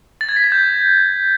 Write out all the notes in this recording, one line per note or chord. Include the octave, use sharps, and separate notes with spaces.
A6
G#6
B6
A6
G6